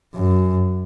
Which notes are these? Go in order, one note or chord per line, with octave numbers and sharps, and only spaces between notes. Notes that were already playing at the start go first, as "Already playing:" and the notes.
F#2